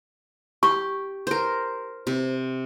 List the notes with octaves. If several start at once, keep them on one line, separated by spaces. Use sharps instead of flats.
G4 C#6
A#4 C5
C3